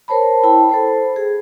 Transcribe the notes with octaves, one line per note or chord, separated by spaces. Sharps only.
A#4 C5 C#5 A5 B5
E4 G5 A5 B5
A4 C5 B5
G#4